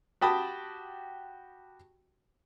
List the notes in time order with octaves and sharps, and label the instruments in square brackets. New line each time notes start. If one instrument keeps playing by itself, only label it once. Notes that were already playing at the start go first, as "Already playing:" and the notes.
[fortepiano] F#4 G4 G5 A5 B5 D#6